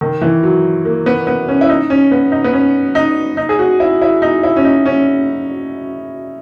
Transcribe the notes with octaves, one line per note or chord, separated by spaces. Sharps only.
D#3
E3
F#3
A#3
B3
B3
C#4
E4
D#4
C#4
B3
D#4
B3
C#4
D#4
D#4
G#4
F#4
E4
E4
D#4
E4
C#4
D#4
C#4